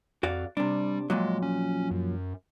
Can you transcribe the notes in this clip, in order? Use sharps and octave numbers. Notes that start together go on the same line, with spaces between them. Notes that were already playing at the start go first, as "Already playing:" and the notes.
F2 F#4 D5 F5
C3 G3 D4
F2 A#2 F#3 G#3
C#4
F#2